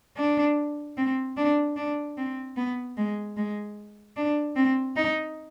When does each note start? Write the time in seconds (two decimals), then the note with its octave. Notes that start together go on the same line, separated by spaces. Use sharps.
0.17 D4
0.97 C4
1.37 D4
1.76 D4
2.17 C4
2.57 B3
2.97 G#3
3.37 G#3
4.17 D4
4.56 C4
4.96 D#4